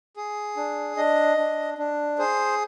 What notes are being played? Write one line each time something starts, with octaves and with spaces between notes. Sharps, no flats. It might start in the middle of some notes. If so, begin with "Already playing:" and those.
G#4
D4
D4 D#5
D4
D4
G#4 C5